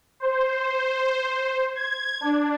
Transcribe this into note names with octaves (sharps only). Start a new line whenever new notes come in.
C5
G#6
D4